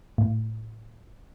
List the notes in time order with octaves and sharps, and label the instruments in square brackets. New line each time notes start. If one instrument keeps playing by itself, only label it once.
[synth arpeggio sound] A2